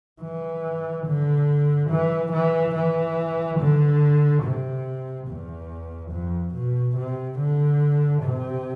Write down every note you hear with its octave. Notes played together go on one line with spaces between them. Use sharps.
E3
D3
E3
E3
E3
D3
C3
E2
F2
B2
C3
D3
C3